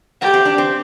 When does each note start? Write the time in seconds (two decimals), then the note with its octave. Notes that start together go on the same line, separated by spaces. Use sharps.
0.21 A3 G4
0.34 C4
0.45 D4
0.58 C4